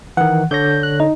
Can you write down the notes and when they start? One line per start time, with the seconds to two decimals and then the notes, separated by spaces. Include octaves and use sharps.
0.17 D#3 E3 F#5
0.51 D3 C#5 G6 A#6
0.83 F#6
1.00 D#4